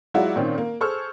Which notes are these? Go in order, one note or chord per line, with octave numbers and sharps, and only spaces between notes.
F#3 G#3 E4 F4 D5 F#5
A#2 D#3 C4 C#4
A#3
G#4 A4 C5 C#6 E6 F6